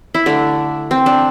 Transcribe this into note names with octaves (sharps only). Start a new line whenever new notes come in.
E4
D3 A3 D4
C4
D4